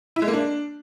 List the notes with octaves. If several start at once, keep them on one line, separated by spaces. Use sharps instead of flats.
E4
G#3
A#3
D4